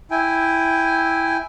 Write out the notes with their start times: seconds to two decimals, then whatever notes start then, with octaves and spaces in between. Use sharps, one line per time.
0.11 E4 G5 G#5